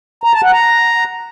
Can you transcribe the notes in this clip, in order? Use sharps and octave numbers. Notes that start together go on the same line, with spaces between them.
A#5
A5
F#5
A#5